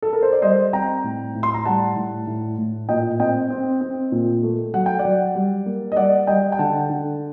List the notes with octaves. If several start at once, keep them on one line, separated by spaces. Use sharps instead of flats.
A4
A#4
C5
D5
G3 C5 D#5
C4 G5 A#5
A2
A2
C6
A#5
G3 F#5 A5
A2
A2
A2
A#2 D#5 G5
C4 D#5 G5
C4
C4
A#2
A3
F#3 F#5
G5
D5 F#5
F#3
G3
A#3
D#5
G3 D5 F#5
G3 D#5 G5
G5
D3 F#5 A5
D3